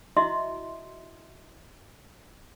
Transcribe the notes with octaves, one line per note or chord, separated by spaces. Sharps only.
E4 F#4 D#5 E5 C6